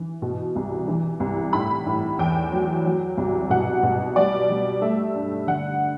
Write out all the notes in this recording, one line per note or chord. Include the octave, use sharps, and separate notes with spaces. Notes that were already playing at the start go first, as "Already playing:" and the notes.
Already playing: E3
B2
C2
E3
C2
A2 B5
A2
E2 G5
F#3
F#3
C2
B2 F#5
B2
G3 D5
G3
A3 E5
G2
D3 F#5